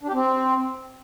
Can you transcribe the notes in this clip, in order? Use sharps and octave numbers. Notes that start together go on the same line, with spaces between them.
D4
G4
C4